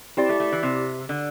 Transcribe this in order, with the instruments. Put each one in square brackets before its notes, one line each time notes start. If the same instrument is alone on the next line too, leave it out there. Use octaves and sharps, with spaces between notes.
[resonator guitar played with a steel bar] C4 [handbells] E4 G4 D5
[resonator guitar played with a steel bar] A3
A3
E3
C3
D3